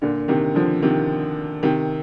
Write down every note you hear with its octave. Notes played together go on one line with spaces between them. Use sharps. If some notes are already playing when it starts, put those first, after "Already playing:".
A#2 D3
C3 D#3
D3 F3
C3 D#3
C3 D#3